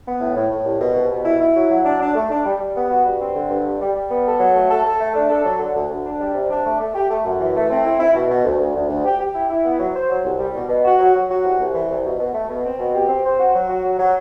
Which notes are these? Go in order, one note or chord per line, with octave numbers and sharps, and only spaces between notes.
B3
A2
A2
A2
C2
B2
C2
B2
E4
E4
F#3
F#3
D4
D4
A3
D4
G3
G3
B3
F#4
G2
C4
D3
G2
G3
G3
G3
B3
A4
F#3
A3
A4
A4
A3
D4
A4
F#3
D3
D2
D2
D4
G3
C3
D4
A3
A3
G4
A3
F#2
E3
A3
C4
E4
E4
B2
B2
D2
D2
D2
D2
G4
G4
E4
E4
B3
F#3
C5
F#3
C2
G3
B2
B2
F#4
F#3
F#3
F#4
C2
C2
E3
C2
B2
B2
A3
B2
C4
B2
G4
C4
C5
F#4
F#3
F#4
F#3
F#3